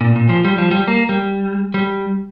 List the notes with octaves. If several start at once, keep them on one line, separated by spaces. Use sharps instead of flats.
A#2
A#2
F3
G3
F3
G3
A#3
G3
G3